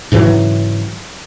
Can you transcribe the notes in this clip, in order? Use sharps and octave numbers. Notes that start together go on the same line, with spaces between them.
G#2 C#3 E3 F#3